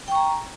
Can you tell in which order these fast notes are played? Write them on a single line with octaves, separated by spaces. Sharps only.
G5 C#6 A#5